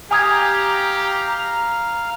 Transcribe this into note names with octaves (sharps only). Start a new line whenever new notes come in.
G4 F5 G#5 A#5 D#6 G#6